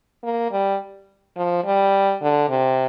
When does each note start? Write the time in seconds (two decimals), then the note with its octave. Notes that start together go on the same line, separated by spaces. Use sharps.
0.23 A#3
0.51 G3
1.37 F3
1.64 G3
2.22 D3
2.49 C3